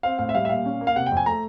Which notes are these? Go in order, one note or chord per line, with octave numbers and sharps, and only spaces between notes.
C4 F5
A2 F5
E5
G3 F5
E5
A#2 F5
C#4
A#3
F5
C3 F#5
G5
F2
G#5
A3 A#5